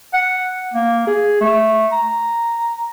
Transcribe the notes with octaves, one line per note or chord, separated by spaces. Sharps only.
F#5
A#3
G#4
A3
A#5